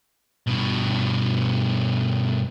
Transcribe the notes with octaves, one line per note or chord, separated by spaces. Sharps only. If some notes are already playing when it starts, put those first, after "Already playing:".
G2 B2